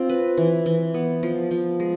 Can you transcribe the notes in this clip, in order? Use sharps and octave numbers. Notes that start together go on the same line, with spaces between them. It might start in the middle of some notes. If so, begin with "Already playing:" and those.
Already playing: C4 F4
B4
E3
E3
B3
F3
F3
G#3